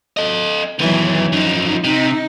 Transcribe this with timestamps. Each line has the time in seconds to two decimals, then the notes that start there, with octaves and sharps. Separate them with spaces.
0.17 A4 D#5
0.79 D#3 E3 F#3 B3
1.33 F#2 F3 D#4
1.84 C3 D#4